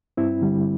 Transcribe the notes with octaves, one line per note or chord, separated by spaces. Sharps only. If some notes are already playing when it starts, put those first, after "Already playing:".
G2 C4 E4
D3 G3